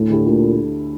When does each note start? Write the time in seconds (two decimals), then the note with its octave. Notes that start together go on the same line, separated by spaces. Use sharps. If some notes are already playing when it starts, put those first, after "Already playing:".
Already playing: D2 A2
0.10 D3 A3 E4 G4
0.26 D2 A#2